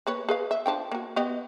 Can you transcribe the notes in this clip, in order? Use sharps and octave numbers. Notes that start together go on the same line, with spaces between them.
A#3 B4 C#5
G#4 B4 F5
E5
F3 D4 G5
A#3 F#4
B3 G4 D#5